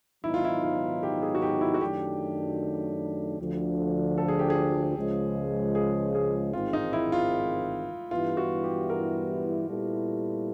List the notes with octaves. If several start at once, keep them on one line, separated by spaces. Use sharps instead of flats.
G#2 D#3 F#3 B3 D#4 E4
F4
E4
F4
G4
G#4
F#4
G4
E4
F#4
F#2 D#3 F#3 A3 D4 G4
D2 D3 F3
A4
G#4
G4
G#4
C#2 C#3 F3 G#3
G#4
G#4
A1 G#2 D#3 G#3 C4 F4
D#4
E4
F4
G2 E3 G3 B3 E4 F4
F#4
G4
A#4
A#2 G3 B3 E4 A4